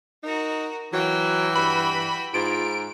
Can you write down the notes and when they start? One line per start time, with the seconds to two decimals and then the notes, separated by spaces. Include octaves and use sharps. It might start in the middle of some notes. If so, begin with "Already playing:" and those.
0.23 D#4 F#4 A#4
0.93 E3 F#3 F#4 G5
1.56 G2 B5
2.34 G#2 F4 D7